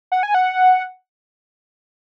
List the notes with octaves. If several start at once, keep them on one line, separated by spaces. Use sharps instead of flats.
F#5
G#5
F#5